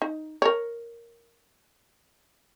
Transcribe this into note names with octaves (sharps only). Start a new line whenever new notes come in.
D#4
A#4 C#5